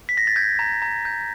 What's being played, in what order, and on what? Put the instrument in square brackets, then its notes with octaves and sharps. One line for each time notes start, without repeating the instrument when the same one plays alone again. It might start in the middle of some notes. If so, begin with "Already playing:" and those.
[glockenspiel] B6
A#6
A6
G6 G#6
A#5
A#5
G6